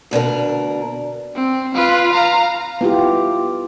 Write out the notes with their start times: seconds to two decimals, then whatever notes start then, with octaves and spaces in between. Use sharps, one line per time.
0.11 D2 B2 D4 A#4
1.35 C4
1.74 F4 B4
2.12 F5 A#5
2.81 B3 E4 F4 G4